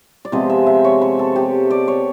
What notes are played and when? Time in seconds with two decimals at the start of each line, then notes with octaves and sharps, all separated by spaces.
0.25 D5
0.32 C3 F3 G#3 B3 D#5
0.50 E5
0.67 E5
0.84 C#5
1.02 B4
1.19 A4
1.36 G4
1.71 D5
1.88 C#5